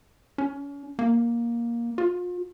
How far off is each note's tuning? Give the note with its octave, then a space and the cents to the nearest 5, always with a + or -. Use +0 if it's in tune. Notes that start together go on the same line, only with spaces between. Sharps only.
C#4 +35
A#3 +10
F4 +35